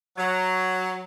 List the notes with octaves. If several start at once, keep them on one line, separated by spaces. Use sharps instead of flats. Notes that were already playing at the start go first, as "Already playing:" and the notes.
F#3